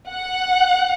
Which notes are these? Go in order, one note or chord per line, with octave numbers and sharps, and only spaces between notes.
F#5